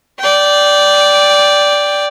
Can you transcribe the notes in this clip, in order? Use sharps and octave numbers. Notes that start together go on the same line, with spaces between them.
D5 G5